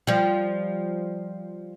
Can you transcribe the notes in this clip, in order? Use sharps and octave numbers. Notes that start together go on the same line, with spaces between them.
F3 G3